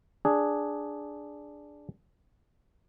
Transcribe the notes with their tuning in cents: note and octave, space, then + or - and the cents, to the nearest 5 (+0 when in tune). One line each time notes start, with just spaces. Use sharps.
D4 +0 G#4 +0